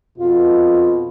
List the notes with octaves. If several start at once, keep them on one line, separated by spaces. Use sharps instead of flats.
F2 B2 F4